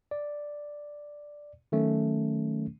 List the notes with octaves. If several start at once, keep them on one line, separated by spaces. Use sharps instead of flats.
D5
D#3 F#3 A3 C#4